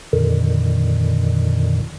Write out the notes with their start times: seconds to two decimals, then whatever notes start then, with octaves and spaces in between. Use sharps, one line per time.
0.13 F2 A#2 D3 D#3